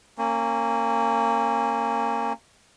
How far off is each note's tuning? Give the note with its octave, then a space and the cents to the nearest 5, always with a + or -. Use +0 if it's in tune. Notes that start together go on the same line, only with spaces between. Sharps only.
A#3 -25 C#4 -25